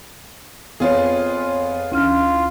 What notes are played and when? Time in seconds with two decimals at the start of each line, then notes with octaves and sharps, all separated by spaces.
0.80 F2 B3 F4 G#4 C#5
1.92 D2 E3 C#4 F4 F6